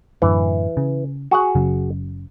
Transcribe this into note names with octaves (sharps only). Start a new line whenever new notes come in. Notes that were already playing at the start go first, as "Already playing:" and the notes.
F#2 A2 D3 E3
C#3
F#4 G#4 F#5
F#1 C#3 F#3